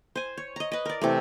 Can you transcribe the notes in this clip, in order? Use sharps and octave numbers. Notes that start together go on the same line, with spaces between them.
C5 G#5
C#5
D#5 A#5
B4 D#5
A#4 D5
C3 E3 A3